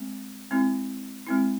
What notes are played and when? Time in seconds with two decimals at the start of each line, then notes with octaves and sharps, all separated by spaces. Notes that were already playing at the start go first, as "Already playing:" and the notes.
Already playing: G#3 C4
0.51 G#3 C4 E4
1.27 G#3 C4 E4